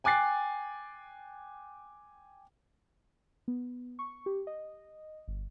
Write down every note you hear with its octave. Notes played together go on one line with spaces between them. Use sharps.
G5 G#5 D6 F#6 A6 C7
B3
C#6
G4
D#5
G1